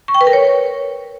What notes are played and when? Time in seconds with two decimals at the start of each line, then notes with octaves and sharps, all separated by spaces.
0.08 C#6
0.14 G5
0.21 B4
0.27 A#4
0.33 C#5